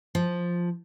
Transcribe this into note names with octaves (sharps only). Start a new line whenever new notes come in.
F3